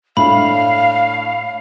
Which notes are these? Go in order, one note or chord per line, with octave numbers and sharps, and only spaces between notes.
A2 D4 F5 B5